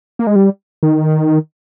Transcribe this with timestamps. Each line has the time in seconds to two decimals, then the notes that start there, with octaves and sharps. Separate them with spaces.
0.19 A#3
0.27 G#3
0.36 G3
0.83 D#3